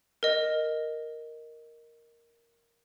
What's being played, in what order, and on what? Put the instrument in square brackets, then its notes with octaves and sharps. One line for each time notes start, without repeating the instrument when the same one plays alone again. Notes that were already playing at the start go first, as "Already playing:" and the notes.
[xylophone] A#4 D#5